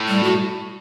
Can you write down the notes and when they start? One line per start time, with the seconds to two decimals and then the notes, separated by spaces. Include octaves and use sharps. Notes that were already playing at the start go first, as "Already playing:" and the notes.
Already playing: A2
0.08 G3
0.23 F#4